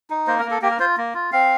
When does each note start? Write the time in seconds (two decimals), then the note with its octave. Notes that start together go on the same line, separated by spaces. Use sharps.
0.10 D#4
0.27 A#3 C5
0.39 A#4
0.45 A#3
0.51 A4
0.62 A#3 G4
0.71 A#4
0.79 F4 C5
0.97 A#3
1.14 F4
1.32 C4 F5